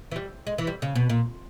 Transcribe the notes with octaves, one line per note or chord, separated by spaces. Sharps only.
E3
G3
G#3
E3
G3
C#3
B2
A#2